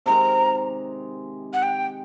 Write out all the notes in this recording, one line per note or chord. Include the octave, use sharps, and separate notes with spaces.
C3 D#3 G#3 A#5
F#5
G5